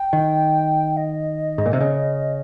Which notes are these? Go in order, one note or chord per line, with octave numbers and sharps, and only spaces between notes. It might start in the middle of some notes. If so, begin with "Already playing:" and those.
Already playing: G5
D#3
D#5
G#2
A#2
C3
C#3